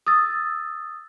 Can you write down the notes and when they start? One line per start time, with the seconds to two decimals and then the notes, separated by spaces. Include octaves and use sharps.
0.07 D#6 E6 A6